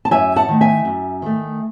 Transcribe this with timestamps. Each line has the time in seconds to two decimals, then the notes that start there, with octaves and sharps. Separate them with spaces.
0.05 A5
0.11 F#2 E5 G#5
0.36 F#5 A5
0.48 D#3 A3
0.61 E5 G#5
0.85 F#2
1.22 D#3 A3